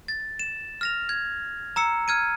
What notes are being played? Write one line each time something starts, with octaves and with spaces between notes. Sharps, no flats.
A6
E7
F6 A#6 F7
G#6
A#5 E6 C#7
F6 G#6 D#7